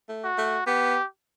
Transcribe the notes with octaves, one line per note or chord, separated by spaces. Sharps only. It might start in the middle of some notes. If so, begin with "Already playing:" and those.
A3
F#4
A3
B3 G4